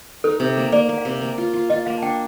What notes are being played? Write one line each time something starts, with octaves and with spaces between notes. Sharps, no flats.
D#4 A4
C3
A#3
A#3 D5
A#3
F5
C3
A#3
F4
F4
F4 D#5
A#3 F5
A5
D4 G5